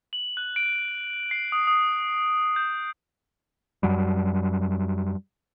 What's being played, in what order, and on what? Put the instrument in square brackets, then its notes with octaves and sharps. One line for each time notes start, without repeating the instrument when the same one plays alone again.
[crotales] F#7
F#6
D7
C7
D#6
D#6
G6
[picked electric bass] F#2 F#3 G3